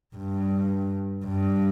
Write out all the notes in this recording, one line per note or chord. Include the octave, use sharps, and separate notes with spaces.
G2
G2